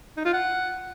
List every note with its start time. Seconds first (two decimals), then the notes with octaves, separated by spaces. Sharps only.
0.17 D#4
0.25 F4
0.33 F#5